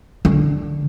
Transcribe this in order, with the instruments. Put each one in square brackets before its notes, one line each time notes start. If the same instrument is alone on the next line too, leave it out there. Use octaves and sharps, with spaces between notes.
[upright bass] D3